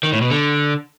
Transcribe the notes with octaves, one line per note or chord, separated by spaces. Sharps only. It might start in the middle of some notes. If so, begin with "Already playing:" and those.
D#3
A2
B2
D3